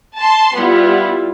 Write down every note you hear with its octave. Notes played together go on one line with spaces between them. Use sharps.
A5 C6
G3 B3 E4 F4